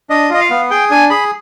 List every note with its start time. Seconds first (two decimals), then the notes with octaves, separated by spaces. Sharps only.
0.10 D4 D#5
0.30 F4 D#5
0.40 F5
0.50 B3
0.71 G#4 G5
0.90 D4 G#5
1.10 G#4 B5